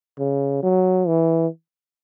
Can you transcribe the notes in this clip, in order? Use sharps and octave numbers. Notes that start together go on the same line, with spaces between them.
C#3
F#3
E3